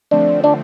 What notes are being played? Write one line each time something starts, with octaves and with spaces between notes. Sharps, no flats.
D3 F3 A3 C4 D4
D4